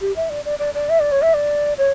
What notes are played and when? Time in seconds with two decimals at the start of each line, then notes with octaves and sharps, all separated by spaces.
0.01 G4
0.16 E5
0.30 D5
0.45 D5
0.59 D5
0.74 D5
0.89 E5
1.00 D5
1.12 C#5
1.22 E5
1.34 D5
1.78 C#5